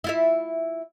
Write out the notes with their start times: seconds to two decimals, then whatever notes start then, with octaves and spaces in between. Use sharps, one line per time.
0.04 E4 F4 E5